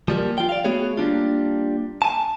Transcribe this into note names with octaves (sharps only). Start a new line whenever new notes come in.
F3 G3 A#3
F4 G5
D5 F5
A3 B3 F#4 G#4 C#5
G3 A#3 D4 F4
G#5 A5